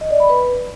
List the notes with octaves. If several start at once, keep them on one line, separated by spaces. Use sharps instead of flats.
D#5
D5
B5
B4